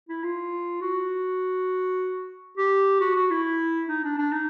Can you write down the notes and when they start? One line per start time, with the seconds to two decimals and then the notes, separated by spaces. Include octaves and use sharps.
0.09 E4
0.24 F4
0.81 F#4
2.57 G4
3.01 F#4
3.15 F#4
3.31 E4
3.89 D#4
4.04 D4
4.18 D4
4.32 D#4